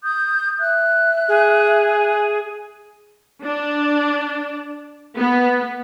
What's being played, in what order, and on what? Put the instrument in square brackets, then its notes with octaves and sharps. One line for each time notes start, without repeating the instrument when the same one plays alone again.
[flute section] D#6 G6
E5 F#6
[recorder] G#4
[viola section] D4
B3